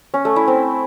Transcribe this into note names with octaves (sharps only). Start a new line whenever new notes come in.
C#4
A3
E4
C4